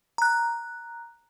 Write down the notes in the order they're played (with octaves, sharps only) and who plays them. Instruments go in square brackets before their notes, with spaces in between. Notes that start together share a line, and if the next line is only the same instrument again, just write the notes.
[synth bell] A#5 F#6